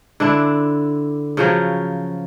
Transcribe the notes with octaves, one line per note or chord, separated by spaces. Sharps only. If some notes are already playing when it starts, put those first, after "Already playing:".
D3 D4 E4
C#3 F3 F#3